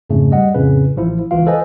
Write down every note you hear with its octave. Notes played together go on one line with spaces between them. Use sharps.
F2 G#2 C#3 A3
G3 D#5 F#5
F2 A2 C#3 B4
A1 F3 E4
C#2 E3 F4 F5
A4 B4 C5 D#5 G#5